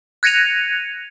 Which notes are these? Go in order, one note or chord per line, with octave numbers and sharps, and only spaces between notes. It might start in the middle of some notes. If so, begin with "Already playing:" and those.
F#6 G#6 A#6 C#7 D#7 F7